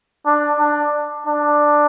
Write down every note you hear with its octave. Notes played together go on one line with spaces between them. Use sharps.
D4
D4
D4